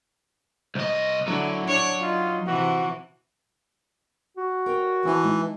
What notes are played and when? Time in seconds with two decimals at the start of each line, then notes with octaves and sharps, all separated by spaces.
0.75 C2 D#5
1.27 D3 F#3 E4
1.66 D4 C#5
2.01 D#4 F4
2.47 C3 E3 F#4
4.37 F#4
4.66 A#4 C#5 G5
5.05 E3 C4 G#5 A5
5.23 G#3 D#4